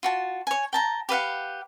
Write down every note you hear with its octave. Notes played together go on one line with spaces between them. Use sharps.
F4 F#4 A5
C#5 G#5
G5 A5 A#5
G4 B4 F5 F#5